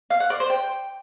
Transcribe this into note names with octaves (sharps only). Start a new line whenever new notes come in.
F5
F#5
D5
C5
G5